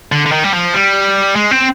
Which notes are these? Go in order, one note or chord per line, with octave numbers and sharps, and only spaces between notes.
D3
D3
D#3
G3
F3
G3
G#3
C4